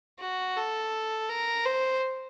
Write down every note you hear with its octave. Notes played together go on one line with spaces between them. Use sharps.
F#4
A4
A#4
C5